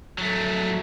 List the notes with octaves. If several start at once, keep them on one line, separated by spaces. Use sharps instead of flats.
F#3 A3